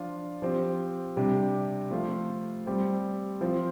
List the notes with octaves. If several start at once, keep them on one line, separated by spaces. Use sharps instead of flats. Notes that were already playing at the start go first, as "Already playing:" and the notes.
Already playing: F3 D4 F4
F3 C4 G4
C3 G3 D4 G4
F3 A3 F4
G3 C4 G4
F3 C4 F4